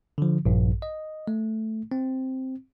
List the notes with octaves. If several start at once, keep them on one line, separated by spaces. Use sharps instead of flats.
D3 F3
A#1 G2
D#5
A3
C4